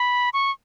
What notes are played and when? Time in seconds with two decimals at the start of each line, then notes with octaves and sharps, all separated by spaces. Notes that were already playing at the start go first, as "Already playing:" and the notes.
Already playing: B5
0.33 C#6